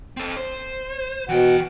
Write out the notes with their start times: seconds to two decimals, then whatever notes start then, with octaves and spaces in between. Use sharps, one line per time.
0.17 C4 A4
0.37 C5
1.29 B2 E3 F#5 G5